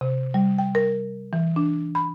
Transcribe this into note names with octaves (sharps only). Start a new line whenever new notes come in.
C3
G3
G5
A#4
E3
D4
B5